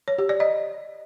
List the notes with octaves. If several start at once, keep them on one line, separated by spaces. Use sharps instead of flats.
C#5
G4
D5
D#5